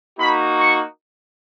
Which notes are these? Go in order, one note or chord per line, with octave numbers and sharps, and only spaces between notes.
A#3 D#4 F#4 B5
C#6